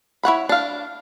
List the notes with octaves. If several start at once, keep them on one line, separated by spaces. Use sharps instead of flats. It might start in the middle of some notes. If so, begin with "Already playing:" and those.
E4 C#5 F#5 B5
D4 F5